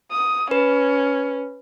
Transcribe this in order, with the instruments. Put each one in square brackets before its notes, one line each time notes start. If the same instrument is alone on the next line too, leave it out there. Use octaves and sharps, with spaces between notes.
[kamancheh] D#6
[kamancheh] C#4 [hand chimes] B4